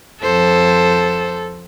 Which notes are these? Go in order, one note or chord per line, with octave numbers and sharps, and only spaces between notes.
F2 A4 C5